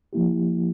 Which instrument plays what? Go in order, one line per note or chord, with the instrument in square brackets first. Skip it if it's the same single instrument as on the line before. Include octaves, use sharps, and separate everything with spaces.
[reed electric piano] F3 A#3 E4 G4